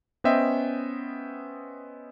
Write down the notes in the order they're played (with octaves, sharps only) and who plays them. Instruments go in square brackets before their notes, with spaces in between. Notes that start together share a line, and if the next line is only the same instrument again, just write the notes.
[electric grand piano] B3 C#4 C5 D#5 E5 G5